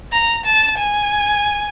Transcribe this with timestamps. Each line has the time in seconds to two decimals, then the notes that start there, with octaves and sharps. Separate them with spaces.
0.12 A#5
0.46 A5
0.78 G#5